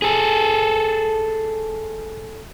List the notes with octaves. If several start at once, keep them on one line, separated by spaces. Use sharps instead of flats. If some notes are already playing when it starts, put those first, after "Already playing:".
G#4 A4